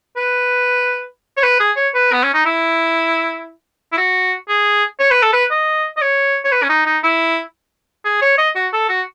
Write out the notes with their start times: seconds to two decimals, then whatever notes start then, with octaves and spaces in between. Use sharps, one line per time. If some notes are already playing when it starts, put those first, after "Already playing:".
0.16 B4
1.37 C#5
1.43 B4
1.60 G#4
1.76 C#5
1.94 B4
2.12 B3
2.23 C#4
2.34 D#4
2.45 E4
3.92 E4
3.97 F#4
4.49 G#4
4.99 C#5
5.11 B4
5.22 A4
5.33 B4
5.51 D#5
5.97 D#5
6.01 C#5
6.44 C#5
6.52 B4
6.63 C#4
6.69 D#4
6.86 D#4
7.03 E4
8.05 G#4
8.22 C#5
8.38 D#5
8.55 F#4
8.73 A4
8.89 F#4